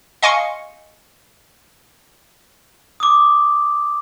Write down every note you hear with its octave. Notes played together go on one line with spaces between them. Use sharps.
D#5 F5 G#5 C6 C#6 C#7
D6 D#6